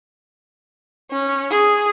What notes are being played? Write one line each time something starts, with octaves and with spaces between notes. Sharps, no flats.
C#4
G#4